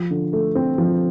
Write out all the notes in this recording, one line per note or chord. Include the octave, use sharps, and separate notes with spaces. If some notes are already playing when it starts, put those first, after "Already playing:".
Already playing: F3
D3
A3
C4
F3